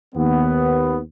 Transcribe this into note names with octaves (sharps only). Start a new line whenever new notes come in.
D#2 B3